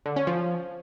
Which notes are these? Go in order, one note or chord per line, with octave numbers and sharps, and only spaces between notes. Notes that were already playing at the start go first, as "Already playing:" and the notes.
D3
C#4
F3